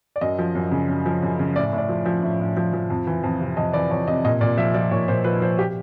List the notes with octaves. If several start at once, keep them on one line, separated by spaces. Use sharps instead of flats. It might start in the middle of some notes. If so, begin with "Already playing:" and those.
D5
F#2 D#5
F3
F#2
C#3
F#2
F3
F#2
C#3
A2 D5
A2 D5
F3
F3
A2
A2
F3
F3
F2
E3
F2
C3
F2 D#5
E3 D5
F2 C#5
C3 D#5
A#2 D#5
A#2 D5
F3 E5
F3 D5
A#2 C#5
A#2 C5
F3 B4
F3 C5
G4